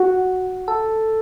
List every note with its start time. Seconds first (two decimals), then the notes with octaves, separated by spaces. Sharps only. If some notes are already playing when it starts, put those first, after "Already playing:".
Already playing: F#4
0.68 A4